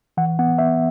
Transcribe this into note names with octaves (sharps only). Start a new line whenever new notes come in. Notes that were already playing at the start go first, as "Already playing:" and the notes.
E3 F#5
B3 F#5
B3 E5